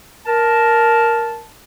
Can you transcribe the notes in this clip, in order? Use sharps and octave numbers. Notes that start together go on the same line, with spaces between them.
A#4 A5